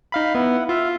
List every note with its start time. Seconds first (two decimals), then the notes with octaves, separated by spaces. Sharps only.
0.12 D#4 F5 B5
0.35 B3 E4 F#5
0.69 F4 E5 F5